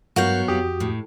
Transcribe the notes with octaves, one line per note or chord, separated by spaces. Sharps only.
G2 F#3 B3 F#4 A#4 F5 G6
F2 F#4 G4 D#6
A2